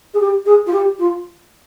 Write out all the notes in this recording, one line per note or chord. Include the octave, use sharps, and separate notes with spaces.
G#4
G4
G#4
F4
G4
F4